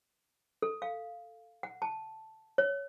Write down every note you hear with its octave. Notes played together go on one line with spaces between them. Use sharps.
A4
F5
F#5
A5
C#5